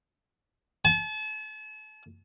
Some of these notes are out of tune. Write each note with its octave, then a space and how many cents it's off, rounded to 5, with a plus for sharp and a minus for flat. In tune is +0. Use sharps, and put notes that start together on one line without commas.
A5 -40